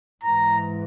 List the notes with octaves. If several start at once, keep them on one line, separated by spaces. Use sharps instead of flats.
G#2 E3 A#5